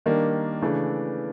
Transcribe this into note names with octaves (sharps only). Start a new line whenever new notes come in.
D#3 G3 A#3 D4
C#3 E3 A3 D4